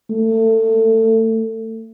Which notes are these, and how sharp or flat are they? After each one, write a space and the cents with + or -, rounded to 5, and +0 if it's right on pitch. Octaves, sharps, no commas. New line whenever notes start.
A3 +25